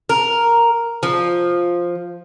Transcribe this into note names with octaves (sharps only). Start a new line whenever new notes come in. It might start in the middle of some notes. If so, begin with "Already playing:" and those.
A#4
F3